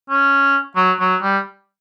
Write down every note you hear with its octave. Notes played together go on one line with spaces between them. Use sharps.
C#4
F#3
F#3
G3